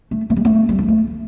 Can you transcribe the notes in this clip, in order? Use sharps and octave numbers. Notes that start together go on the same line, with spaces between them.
A3
A3
G3
A3
G3
F3
A3